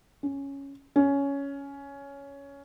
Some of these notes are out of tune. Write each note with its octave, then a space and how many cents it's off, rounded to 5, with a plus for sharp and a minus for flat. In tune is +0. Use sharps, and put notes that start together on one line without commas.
C#4 +0
C#4 +10